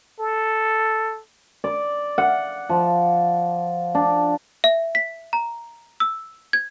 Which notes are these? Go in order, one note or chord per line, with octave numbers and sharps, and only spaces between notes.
A4
D5
F#5
F3
D4
E5
B6
A#5
E6
G#6